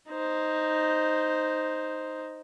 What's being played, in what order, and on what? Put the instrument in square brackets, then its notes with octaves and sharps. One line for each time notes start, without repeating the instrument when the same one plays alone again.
[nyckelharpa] D#4 C5